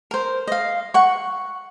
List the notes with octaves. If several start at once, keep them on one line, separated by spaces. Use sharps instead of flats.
A#4 C5
D#5 F5
F#5 C#6